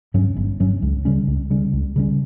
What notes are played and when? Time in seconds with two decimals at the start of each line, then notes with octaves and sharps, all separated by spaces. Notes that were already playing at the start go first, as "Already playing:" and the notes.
0.14 G2 F#3 C#4
0.37 G1
0.60 G2 F#3 C#4
0.82 C#2
1.05 C#3 G3 C#4
1.27 C#2
1.50 C#3 G3 C#4
1.73 C#2
1.96 C#3 G3 C#4